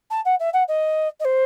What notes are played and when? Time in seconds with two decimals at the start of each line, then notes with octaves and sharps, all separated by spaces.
0.11 A5
0.25 F#5
0.39 E5
0.53 F#5
0.68 D#5
1.20 D#5
1.25 C5